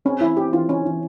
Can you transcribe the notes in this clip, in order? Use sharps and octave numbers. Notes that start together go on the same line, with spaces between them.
C4 C#4
E3 E4
C4 G4
E3 F4
E3 C#4
E3